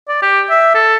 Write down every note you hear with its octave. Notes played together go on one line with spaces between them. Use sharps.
D5
G4
E5
A4